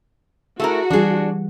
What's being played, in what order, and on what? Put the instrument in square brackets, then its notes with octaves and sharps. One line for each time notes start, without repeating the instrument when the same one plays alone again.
[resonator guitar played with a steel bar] A3 E4 A#4 [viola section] F#4 [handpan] G#4
[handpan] E3 G3 [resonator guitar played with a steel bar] D4 G#4